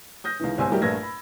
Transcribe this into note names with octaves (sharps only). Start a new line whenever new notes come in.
D#6 G6 A#6
C#2 D#3 E3
G1 C2 G#2 C5 G#5 E6
E3 F#3 G3 A3 G4 A#4
A#1 G2 A3 A#4 G#6 A#6
B5